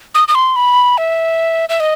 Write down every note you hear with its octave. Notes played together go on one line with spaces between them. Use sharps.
D#6
D#6
C6
B5
E5
E5
D#5